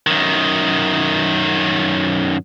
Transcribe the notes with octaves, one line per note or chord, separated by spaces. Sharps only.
F#2 D#3